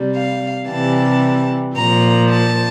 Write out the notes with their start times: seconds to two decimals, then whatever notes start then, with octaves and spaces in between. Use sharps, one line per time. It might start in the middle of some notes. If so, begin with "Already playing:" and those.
Already playing: C3 G3
0.14 F5
0.67 C3 E3 G3 A5
1.76 A#2 F3 A#5
2.30 A5